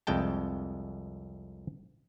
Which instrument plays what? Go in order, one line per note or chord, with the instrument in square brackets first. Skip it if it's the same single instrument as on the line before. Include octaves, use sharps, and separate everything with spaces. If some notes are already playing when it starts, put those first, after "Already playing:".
[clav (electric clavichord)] C2 F2 G#3 G5 A5